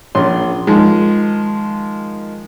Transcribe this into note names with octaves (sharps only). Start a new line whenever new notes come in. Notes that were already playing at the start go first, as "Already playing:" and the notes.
A#1 C#4 C6
D#3 F3 G#3